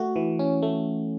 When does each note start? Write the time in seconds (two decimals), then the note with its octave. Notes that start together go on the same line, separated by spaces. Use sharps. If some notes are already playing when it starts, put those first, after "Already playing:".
Already playing: A3 F#4
0.16 E3
0.39 C#4
0.62 A3